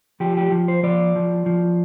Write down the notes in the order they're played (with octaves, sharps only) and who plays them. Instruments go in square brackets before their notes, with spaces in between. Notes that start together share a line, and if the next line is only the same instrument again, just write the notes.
[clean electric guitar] F3 G4
G4
F3
C5
F3 D5
F3
F3